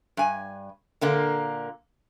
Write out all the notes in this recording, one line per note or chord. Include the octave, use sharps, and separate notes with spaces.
G2 G#5
A#2 D3 A#3